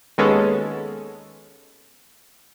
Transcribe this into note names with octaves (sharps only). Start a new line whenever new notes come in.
D#2 G#3 B3 C#4 A4